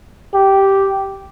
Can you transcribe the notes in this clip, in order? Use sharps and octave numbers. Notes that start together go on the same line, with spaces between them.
G4